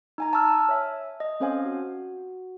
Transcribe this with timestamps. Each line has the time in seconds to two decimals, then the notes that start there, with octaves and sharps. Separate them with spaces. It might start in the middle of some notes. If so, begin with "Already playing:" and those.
0.18 D#4 G#5 A#5
0.33 A5 C#6 E6 F6
0.69 C#5 E5 G#5
1.20 D#5
1.40 C4 C#4 A4 C5 F5 G#5
1.66 F#4